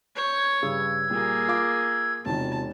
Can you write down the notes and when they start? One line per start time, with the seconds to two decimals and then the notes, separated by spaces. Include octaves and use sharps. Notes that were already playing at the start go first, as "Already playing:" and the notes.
0.16 C#5 G6
0.62 G2 C#3 G#4 E6 G#6
1.10 A#2 G3 A#3 G#4
1.48 F4 F5 D6
2.26 E1 C3 D#3 C4 F4 A5